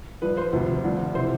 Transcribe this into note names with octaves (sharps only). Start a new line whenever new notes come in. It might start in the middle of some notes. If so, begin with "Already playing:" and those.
G2 F3 B4
C5
D2 C3 F3
G2 D3 F3
C3 E3 C5